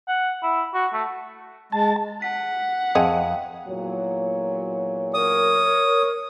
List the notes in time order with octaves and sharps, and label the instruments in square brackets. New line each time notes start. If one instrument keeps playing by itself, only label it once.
[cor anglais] F#5
E4
F#4
A3
[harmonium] G#3 [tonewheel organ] A5
[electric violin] F#5 [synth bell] B6
[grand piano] F2 [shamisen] C4 G#4 D#5 [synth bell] F5 G5 A5
[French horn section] E2 A#2 F#3
[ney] A#4 [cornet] C#5 [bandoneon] D#6